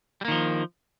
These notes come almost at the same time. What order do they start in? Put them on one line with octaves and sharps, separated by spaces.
G3 A#3 D#3 F3